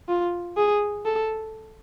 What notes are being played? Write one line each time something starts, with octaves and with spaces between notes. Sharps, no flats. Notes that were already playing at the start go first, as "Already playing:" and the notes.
F4
G#4
A4